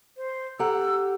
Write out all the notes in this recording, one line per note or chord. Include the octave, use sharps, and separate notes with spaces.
C5
G4 A4 F#5 A#5 E6